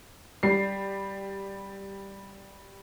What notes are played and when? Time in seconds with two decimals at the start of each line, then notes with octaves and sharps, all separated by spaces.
0.43 G3 C7